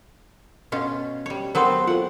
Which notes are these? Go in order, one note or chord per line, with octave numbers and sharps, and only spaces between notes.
B2 C#4 F4
G3 C#5
F#3 B3 C4 A#4 C5 C6
F4 A4 F#5